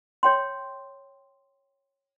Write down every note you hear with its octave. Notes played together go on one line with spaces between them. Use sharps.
C#5 G5 C6